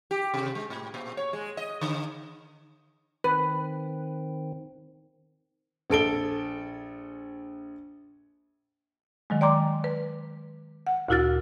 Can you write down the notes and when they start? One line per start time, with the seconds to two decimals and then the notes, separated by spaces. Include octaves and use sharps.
0.11 G4
0.34 C3
0.55 G#3
0.70 A2
0.94 A#2
1.17 C#5
1.33 G#3
1.57 D#5
1.81 D3
3.24 D#3 C4 B4
5.90 A#1 A4 D7 G7
9.30 D#3 F#3 G#3
9.41 D5 G5 A#5 C6 D6
9.84 B4
10.87 F#5
11.09 D2 A#2 E4 F#4 F6 A6